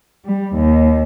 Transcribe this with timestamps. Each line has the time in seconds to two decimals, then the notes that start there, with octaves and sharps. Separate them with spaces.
0.25 G3
0.55 D#2